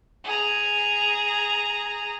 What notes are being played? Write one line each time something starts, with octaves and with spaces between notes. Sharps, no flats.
G#4 A#5